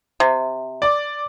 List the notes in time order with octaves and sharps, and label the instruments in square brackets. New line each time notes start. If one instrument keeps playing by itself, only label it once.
[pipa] C3
[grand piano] D5 D6